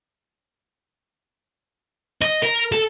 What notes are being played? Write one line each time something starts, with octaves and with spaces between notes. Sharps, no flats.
D#5
A#4
A4